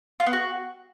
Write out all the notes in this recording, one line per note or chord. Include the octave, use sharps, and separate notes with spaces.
F4
B3
F#4